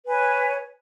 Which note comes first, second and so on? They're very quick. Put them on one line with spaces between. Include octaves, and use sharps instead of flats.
B4 G#5 C#5